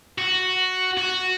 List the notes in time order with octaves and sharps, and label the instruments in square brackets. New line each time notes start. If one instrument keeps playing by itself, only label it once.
[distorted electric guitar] F#4
F#4